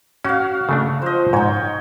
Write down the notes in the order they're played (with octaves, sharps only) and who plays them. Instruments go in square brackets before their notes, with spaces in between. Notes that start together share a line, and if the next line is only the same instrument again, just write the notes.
[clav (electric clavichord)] C#4 [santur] F#4 F5
[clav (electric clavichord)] C#3 A3 D4
[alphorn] F3 [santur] C5 D#5
[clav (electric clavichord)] G#2 [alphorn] D#4 [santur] C#5 G5